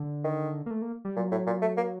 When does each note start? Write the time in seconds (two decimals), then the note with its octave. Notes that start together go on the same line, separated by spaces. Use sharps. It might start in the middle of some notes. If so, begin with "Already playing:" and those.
Already playing: D3
0.24 D#3
0.66 A#3
0.71 A3
0.82 A#3
1.05 G3
1.16 A#2 F#3
1.32 A2
1.47 A#2
1.62 A3
1.77 A#3